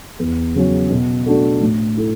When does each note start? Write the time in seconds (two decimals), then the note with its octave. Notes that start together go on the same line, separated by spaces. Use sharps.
0.19 E2
0.56 C#3 F#3 C#4
0.90 B2
1.26 A3 D4 F#4 A4
1.61 A2
1.96 A3 E4